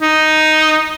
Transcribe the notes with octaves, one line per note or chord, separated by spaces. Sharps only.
D#4